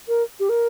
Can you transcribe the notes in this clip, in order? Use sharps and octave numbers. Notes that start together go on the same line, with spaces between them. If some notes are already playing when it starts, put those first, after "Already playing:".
A#4
G4
A#4